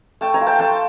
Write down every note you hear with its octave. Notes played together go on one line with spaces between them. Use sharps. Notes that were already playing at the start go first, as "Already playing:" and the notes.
A3 G5 A5
G#5 A#5
F4
G5 A5
A3 G5 A5